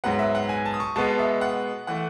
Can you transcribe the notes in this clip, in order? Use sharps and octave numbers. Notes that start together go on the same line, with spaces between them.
G#2 F#3 B3 F#5
E5
F#5
G#5
A5
D#6
C#6
B2 G#3 B3 A5
E5
F#5
E3 A3 F#5